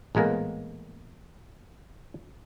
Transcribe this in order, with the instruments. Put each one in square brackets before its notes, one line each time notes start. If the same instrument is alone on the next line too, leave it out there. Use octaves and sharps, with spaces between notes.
[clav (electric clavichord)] A1 A#2 G#3 A#3 B3